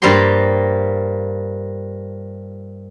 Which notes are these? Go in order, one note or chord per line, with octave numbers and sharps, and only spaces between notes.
G2 F3 G3 A#3 G4 C6